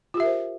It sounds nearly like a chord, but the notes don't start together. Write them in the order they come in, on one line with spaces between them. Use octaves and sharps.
F4 G4 E5 A#4 C5